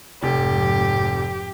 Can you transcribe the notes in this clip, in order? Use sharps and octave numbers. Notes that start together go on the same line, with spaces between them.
F1 F2 G#2 G4